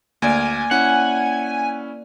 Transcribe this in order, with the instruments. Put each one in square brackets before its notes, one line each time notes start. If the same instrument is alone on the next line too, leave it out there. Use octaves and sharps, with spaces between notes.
[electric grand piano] D2 [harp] A#3 D5 F5 [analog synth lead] G#5
[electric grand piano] C#4 E4 [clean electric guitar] F#5